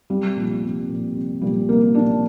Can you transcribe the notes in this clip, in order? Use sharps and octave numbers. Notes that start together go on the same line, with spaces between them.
C2 G3
A#2 F3
C2
A#2 F3
C2
A#2 F3 G3
C2 A#3
A#2 F3 D4